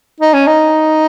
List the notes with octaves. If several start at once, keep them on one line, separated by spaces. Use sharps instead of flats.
D#4
C#4
D#4